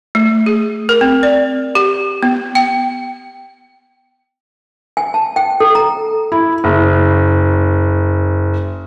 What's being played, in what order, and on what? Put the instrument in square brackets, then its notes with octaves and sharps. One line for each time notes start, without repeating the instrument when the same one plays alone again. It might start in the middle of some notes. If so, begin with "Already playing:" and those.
[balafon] A3
G#4
A#4
C4
D5
G4
B3
G5
[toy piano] G#5
A5
G5
A4
A#5
[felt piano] E4
F#1